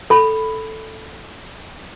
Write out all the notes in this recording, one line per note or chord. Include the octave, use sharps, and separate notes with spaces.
A4 B5